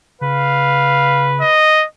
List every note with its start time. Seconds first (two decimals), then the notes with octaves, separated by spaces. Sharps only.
0.21 C#3 B4 F5
1.40 D#5